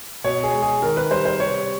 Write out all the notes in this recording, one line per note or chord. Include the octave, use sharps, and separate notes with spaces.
B2 C#5
G#4
G#3
G#4
D#3 A#4
B4
G3 C5
C5
C3 C#5